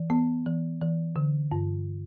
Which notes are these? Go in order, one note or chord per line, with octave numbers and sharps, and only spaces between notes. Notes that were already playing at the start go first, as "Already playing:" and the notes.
Already playing: E3
B3
E3
E3
D3
G2